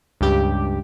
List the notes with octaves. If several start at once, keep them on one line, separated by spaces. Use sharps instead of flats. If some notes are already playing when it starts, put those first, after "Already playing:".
C#2 G2 G4